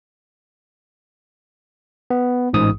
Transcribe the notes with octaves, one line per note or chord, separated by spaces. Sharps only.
B3
A1 G#2 D#6